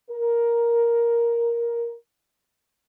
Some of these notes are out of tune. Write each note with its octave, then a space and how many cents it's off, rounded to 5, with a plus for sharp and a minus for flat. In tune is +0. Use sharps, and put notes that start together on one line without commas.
A#4 +5